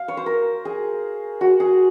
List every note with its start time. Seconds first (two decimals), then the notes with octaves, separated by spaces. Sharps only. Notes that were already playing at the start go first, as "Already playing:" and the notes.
Already playing: F5
0.08 C#5
0.17 C5
0.26 A#4
0.65 G#4
1.41 F#4
1.60 G#4